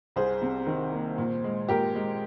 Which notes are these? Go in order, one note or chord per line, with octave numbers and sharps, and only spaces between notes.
C2 G#4 C5
C3
D#3
A#3
A#2
G#3
A#2 G4 A#4
G#3